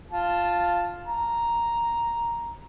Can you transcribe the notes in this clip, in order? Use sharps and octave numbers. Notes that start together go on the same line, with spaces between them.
F4 A5
A#5